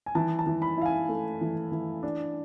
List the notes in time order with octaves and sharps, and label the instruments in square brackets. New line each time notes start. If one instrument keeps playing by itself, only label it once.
[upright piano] G#5
E3 A5
A5
E3
B5
E4 F5
G#5
A3
E3
E3
D4